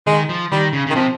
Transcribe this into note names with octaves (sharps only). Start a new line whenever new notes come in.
D#3 G#3
F3
D#3 G3
C#3
C#3
D#3
C3 F3